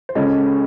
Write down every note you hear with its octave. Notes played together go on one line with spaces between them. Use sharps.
C5
C#2 C#3 G#3 C#4 A4